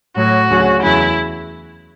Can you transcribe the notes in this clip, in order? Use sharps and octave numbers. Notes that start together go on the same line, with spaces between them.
A2 F#3 F#4
D2 C#3 F#3
E2 C#3 F#3 E4